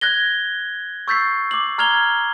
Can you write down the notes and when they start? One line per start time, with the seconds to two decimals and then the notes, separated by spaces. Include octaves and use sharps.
0.01 F#6 G#6 A#6 G7
1.08 C#6 E6 G6 A6 B6 C7
1.51 D6 F#7
1.78 A#5 F6 G#6 F7 G7